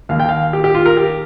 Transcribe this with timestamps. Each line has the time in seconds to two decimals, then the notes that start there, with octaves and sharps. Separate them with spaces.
0.09 D#2 D#3 A#3 F5
0.20 G5
0.29 F5
0.53 G4
0.64 G4
0.75 F4
0.86 A#4
0.97 G4